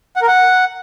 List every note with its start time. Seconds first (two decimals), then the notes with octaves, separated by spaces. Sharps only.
0.16 F#5
0.22 A#4
0.27 F#5